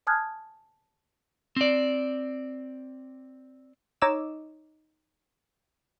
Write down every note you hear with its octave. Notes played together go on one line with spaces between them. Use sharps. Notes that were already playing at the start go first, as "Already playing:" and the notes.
G#5 A5 D#6 F6 F#6 G#6
C4 D5
D#4 C#5 D#5 D6 E6 E7